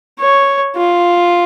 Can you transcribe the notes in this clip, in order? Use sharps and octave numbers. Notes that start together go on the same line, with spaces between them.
C#5
F4